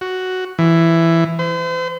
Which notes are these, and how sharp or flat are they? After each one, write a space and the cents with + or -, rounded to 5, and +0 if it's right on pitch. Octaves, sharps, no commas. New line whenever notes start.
F#4 +5
E3 +10
C5 -40